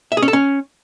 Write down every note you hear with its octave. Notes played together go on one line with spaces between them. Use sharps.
E5
G#4
C#4
A4
C#4